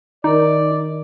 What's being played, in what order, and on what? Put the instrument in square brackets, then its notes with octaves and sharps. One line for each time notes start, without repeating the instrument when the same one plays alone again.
[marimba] D#3 A#4 [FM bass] D#4 [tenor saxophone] D5